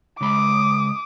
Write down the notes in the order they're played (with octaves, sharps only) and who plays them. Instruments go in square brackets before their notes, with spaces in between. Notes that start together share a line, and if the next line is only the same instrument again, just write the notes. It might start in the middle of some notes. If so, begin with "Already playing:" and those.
[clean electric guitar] C#3 G#3 B5 [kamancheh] D6 D#6